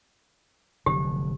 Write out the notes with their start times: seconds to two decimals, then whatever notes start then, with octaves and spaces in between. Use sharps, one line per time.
0.86 F1 D3 F#3 G4